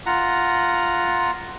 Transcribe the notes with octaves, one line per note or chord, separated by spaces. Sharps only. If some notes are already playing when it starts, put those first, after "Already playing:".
F4 F#5 A#5